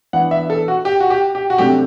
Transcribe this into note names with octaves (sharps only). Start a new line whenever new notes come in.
E3 B3 D4 F#5
E5
A4
F#4
G4
F#4
G4
G4
F#4
C3 F#3 A3 D4 G4